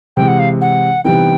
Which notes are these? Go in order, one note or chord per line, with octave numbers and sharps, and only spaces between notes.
C3 E3 G#3 G5
F#5
F5
F#5
C3 E3 G3 B3 D#4 G5